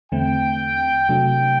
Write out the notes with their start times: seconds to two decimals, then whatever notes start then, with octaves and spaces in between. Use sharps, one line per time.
0.12 E2 D3 A3 C4 G5
1.09 C3 F#3 A3 D4 G5